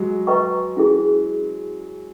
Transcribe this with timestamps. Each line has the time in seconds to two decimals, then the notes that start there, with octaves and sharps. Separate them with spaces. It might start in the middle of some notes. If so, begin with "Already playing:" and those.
Already playing: F#3 G#3
0.27 B4 D#5 G5 A#5 C#6
0.77 C#4 E4 G#4